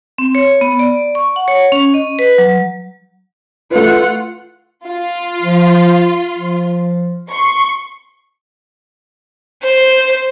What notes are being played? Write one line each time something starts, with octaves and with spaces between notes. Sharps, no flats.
C4
C#5
B3
D5
C#6
F#5
C#5
C#4
D#5
B4
F#3
A3 F4 B4 F#5
F4 C6
F3
F3
C6 C#6
C5